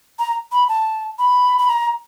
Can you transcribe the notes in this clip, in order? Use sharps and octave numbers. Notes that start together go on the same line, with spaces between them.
A#5
B5
A5
B5
B5
A#5